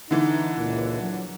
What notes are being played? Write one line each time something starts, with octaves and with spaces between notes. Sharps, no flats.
D3 E3 D#4
C#2 A#2
F#3